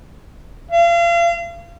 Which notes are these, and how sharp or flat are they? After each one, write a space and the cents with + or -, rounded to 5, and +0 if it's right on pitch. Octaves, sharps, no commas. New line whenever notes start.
F5 -35